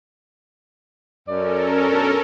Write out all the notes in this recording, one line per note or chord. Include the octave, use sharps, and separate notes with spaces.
F#2 C#4 A4 A#4 D5
F#2 B2 D4